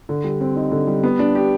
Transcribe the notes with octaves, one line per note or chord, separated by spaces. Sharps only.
D3
G3
C4
D#4
D3
G3
B3
D4
G4